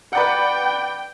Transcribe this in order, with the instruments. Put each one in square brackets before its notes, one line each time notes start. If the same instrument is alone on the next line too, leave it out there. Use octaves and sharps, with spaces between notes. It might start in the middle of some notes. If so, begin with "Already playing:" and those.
[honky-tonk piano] B4 D5 F#5 [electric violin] G5